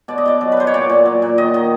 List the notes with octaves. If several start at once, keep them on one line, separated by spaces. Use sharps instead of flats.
B2 D5
D#5
B2 D5
F#3
B4
F#3 C5
C#5
A#2 D5
A#2
F#3
A#2
D#3 D#5
D#3